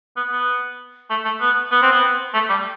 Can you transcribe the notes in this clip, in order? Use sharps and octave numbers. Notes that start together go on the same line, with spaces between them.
B3
B3
A3
A3
B3
B3
C4
B3
A3
G3